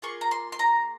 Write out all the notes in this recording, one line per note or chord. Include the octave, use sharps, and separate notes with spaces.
A#3 F4 G#4 C#6
A#5
C6
C6
A#5